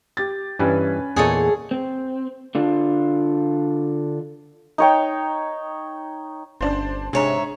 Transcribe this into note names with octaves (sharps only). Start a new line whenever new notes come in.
G4 A6
G2 E3 G3 C#4 B4 G#5
E2 A#2 G#4 A4 C#5 D#5
C4
D3 D4 F4
D#4 C#5 G5
G1 C#4 D4 C5
G#2 C3 D4 G#4 C#5 E5 G#5 A#5